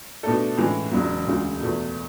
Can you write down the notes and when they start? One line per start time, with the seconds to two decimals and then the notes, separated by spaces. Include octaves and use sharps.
0.23 B2 A3 D4 A4
0.57 A2 E3 G#3 C#4
0.92 E1 E2 C#3 F#3
1.27 E1 D2 C#3 G#3
1.61 E2 B2 A3